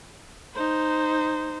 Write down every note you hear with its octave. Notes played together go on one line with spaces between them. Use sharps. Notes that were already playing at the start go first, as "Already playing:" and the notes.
D#4 C5